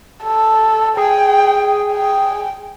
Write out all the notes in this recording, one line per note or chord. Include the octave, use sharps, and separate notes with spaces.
A4
G#4 G5
G5